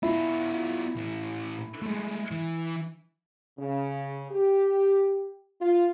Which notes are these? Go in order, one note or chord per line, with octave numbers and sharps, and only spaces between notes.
B3 E4 F4
A2 E3
G#3 A3
E3
C#3
G4
F4